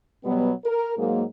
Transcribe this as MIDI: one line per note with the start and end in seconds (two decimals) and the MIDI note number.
0.24 0.51 47
0.24 0.51 54
0.24 0.51 55
0.24 0.51 59
0.65 0.93 70
0.98 1.22 44
0.98 1.22 54
0.98 1.22 56
0.98 1.22 58